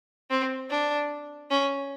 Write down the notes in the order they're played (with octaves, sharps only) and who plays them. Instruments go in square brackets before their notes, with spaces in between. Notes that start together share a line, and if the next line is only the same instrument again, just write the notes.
[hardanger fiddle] C4
D4
C#4